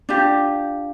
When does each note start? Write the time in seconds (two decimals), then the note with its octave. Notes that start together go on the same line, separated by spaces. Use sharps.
0.09 D4 F4 G4